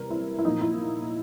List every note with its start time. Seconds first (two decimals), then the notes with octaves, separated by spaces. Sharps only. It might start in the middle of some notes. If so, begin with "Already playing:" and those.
Already playing: C3 E3 G3 C4 A#4
0.10 E4
0.39 E4
0.45 A#2 F3 A#3 D#4
0.61 E4